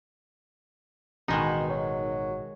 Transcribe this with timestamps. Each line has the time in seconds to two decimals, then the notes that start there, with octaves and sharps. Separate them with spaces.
1.28 A1 B2 D#3 G#3 D#4
1.70 F#3